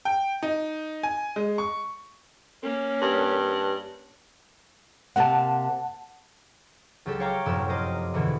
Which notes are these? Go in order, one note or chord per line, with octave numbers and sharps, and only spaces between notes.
G5
D#4
G#5
G#3
C#6
A#3 C#4
G2
C3 A#3 C4 F#5 A5
C#2 F#3 G4 A4
C#5 F5 G5 A#5 C#6 D6
F1 F#2 A2 F3 G4 E6
A#4 C5 D#5 D6 D#6
E2 B2 D3 E3